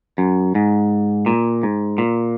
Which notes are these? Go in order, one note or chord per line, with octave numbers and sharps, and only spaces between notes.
F#2
G#2
A#2
G#2
A#2